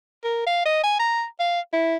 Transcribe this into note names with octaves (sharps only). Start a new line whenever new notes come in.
A#4
F5
D#5
G#5
A#5
F5
E4